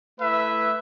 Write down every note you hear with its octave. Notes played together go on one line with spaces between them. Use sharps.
A3 E4 B4 E5